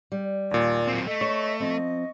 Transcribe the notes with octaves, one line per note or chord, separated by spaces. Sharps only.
G3
D#2 A#2 D5
F#3 C4
A3 D#5
B4 C#5 C#6
F3 C4 D#5